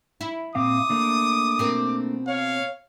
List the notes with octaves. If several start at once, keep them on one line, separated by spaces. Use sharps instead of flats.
E4
A#2 C4 F5 D6 D#6
A3 A#3 D4
B2 C4 A#4
C#5 F5